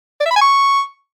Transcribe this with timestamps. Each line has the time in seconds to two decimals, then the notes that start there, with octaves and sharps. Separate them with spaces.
0.21 D5
0.26 E5
0.31 B5
0.36 G#5
0.41 C#6